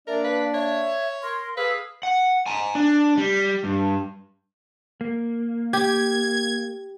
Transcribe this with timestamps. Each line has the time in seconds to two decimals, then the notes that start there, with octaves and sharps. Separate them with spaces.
0.08 A#3 D4 A#4 D5 E5
0.24 B4 F5
0.54 C#5 E5
1.23 A#4 C6
1.57 G#4 A4 B4 F5 E6
2.03 F#5
2.46 G#5 A#5
2.75 D4
3.17 G3
3.64 G2
5.01 A#3
5.73 G4 G#6